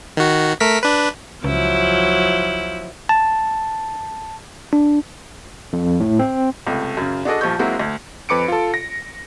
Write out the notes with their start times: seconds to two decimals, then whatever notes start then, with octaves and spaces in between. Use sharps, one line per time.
0.17 D#3 F#4
0.60 A3 A#4 B6
0.83 D4 B4
1.44 C#2 F3 F#3 E4
3.09 A5
4.73 D4
5.73 F2
6.00 A2
6.19 C4
6.66 C#2 C3 A3
6.97 F#2 C#3
7.25 D4 F#4 G#4 A4 D5 D#5
7.41 A#1 F3 G3 C#6 G6
7.59 F#3 G#3 A#3 C4 E4 F#4
7.79 D2
8.29 F2 B4 D6 C#7 D7
8.48 F4 A4
8.74 A#6